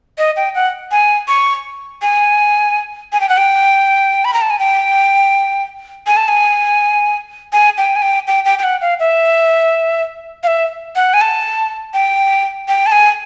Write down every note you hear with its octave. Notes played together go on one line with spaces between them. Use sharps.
D#5
G5
F#5
G#5
C#6
G#5
G#5
G5
F#5
G5
B5
A#5
A5
G#5
G5
G#5
A5
G#5
G#5
G5
G#5
G5
G5
G5
G5
F#5
F5
E5
F5
E5
F#5
G#5
A5
G5
G5
A5
G#5